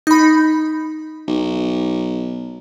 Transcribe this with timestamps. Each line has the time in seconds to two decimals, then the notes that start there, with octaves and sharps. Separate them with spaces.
0.07 D#4 B5
1.28 B1